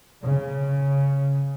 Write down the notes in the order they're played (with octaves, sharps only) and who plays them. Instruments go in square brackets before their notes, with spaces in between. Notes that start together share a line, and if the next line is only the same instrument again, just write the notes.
[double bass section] C#3